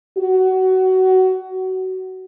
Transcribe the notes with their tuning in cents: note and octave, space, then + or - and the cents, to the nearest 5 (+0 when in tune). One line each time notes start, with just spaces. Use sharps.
F#4 +20